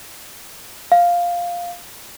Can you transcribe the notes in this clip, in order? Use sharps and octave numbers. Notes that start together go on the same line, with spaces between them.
F5